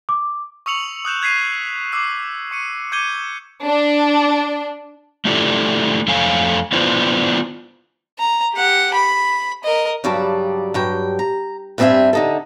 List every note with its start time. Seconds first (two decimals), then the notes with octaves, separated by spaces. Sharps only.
0.09 D6
0.66 C#6 D#6 E6 C#7 F7 F#7
1.05 D#6 F#6 G6 E7
1.22 F#6 G#6 B6 C7 D#7
1.92 D6 E6 C7
2.51 C#6 C#7 D#7
2.92 D6 G6 G#6 C#7 D#7 G7
3.65 D4
5.25 A3 D4 E4 F4 G4 A4
6.08 F2 A3 A4 C#5 F5 G#5
6.72 B3 D4 E4 F4 B4 C5
8.18 A#5
8.54 G4 F#5
8.94 B5
9.64 A#4 D#5
10.04 G2 C#3 F#3 G3 D5 A5
10.74 G2 F#3 G5
11.19 A#5
11.78 G2 G3 C4 F#4 E5 G#5
12.13 D3 D#4 A4